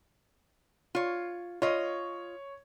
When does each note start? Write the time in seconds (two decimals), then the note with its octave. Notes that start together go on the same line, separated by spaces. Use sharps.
0.95 F4 C#5
1.62 F4 C#5 D#5